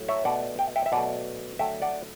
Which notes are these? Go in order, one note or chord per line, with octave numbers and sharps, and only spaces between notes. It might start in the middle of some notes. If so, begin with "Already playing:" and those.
Already playing: A2 F#3
C#5 E5
B2 A3 D5 F#5
G5
E5 G5
E5
B2 F#3 A3 D5 F#5
D3 F#3 A3 E5 G5
D5 F#5